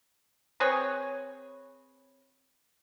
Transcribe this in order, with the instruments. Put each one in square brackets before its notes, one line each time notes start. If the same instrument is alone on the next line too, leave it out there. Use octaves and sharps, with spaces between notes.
[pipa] C4 G#4 B4 C#5